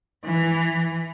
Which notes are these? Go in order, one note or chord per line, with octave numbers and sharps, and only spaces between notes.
E3